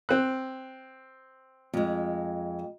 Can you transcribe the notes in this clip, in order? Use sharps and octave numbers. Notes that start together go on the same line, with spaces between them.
C4 F#6
F2 G#3